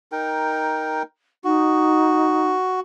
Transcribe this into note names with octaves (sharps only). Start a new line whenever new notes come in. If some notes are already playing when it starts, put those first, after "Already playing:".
D#4 A#4 G5
D#4 F#4